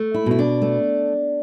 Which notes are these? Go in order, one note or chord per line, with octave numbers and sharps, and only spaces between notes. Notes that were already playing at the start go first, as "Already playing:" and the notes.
Already playing: A3
E4
B2 E4
D4
A3